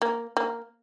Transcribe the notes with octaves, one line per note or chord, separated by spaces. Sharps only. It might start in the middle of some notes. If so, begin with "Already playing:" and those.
A#3
A#3